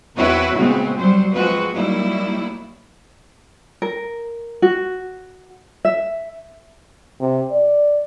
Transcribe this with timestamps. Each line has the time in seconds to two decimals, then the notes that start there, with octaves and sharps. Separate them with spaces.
0.16 E2 C4 E4 F#4 B4 C#5
0.55 A#2 C#3 G#3 B3 C4 F#4
0.94 F#3 G3 C5
1.32 F3 G#3 C4 F#4 B4
1.73 F#3 G3 A#3 D#4 E4
3.82 A#4
4.62 F#4
5.85 E5
7.21 C3
7.51 D5